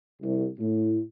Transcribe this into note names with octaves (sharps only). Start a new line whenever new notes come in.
C2
A2